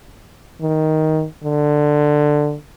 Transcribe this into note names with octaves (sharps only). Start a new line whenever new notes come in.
D#3
D3